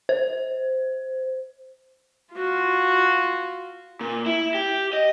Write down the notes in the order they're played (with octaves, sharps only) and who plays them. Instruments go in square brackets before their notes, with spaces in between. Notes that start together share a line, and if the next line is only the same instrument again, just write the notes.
[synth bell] C5
[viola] F4 F#4
[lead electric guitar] A#2
E4
G4
D#5